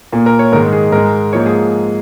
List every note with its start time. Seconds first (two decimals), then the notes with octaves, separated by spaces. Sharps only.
0.12 A#2 A#3
0.26 A#4
0.39 C#5
0.52 G#2 D#3 G#3 A#4
0.73 G#4
0.92 G#2 G#3 A#4
1.33 G#2 F3 A#3 C#5
1.46 G#4